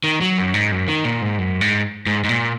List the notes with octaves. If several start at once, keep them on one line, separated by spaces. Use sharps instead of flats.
D#3
F#3
F#2
G#2
F#2
D#3
A#2
G#2
F#2
G#2
G#2
G#2
A#2